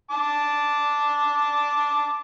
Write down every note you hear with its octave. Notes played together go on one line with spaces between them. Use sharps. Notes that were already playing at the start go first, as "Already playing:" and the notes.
A5 D6